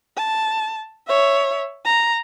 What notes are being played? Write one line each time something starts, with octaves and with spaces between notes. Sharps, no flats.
A5
C#5 E5
A#5